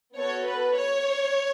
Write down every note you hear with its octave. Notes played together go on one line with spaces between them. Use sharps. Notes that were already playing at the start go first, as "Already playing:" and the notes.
B3 F#4 A4 C#5
B4
C#5